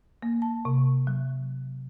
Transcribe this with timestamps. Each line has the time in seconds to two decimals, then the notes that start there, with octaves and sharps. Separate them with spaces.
0.22 A#3
0.42 A5
0.65 C3
1.07 F#3